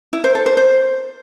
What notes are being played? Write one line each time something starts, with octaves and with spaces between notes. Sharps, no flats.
E4
C5
A4
C5
C5